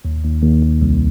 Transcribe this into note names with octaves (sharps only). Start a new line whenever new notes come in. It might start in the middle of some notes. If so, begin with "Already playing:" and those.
D#2
D#2
D#2
D#2
C2